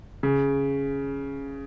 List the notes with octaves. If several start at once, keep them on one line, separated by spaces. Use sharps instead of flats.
C#3